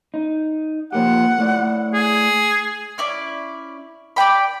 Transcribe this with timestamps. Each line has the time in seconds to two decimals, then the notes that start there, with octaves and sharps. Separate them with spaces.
0.14 D#4
0.92 F3 A#3 G4 F#5
1.38 A3 E4 D5
1.94 G#4
2.98 C#4 E4 D5
4.16 D5 F5 G5 B5